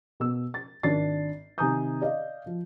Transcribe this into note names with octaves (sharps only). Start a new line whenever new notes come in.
B2 E6
A6
G#1 D4 A6 C7
C3 D#3 G#5 A#5 D#6 G6
D5 D#5 F5
F3